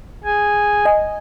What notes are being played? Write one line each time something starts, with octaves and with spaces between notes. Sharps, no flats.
G#4 G#5
D#5 G#5